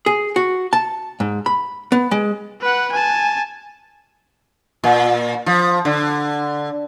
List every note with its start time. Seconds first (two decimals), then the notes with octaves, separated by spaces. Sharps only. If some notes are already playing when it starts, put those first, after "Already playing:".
0.06 G#4
0.36 F#4
0.73 A5
1.20 G#2
1.46 B5
1.92 B3
2.11 G#3
2.61 B4 F#5
2.92 G#5 A5
4.84 A#2
5.46 F3
5.85 D3